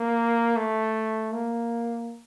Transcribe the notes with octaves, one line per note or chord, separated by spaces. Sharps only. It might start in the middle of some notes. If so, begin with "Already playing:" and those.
Already playing: A#3
A3
A#3